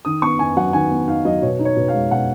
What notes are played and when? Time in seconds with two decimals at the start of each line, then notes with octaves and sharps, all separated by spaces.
0.05 D#3 D#6
0.22 B3 C#6
0.39 D#4 G#5
0.57 F#3 F#5
0.73 D#3 G#5
0.91 B3
1.08 D#4 F5
1.25 F#3 D#5
1.42 B2 C#5
1.59 D#4
1.65 C#5
1.76 B2
1.88 F5
1.94 G#3
2.11 B2 F#5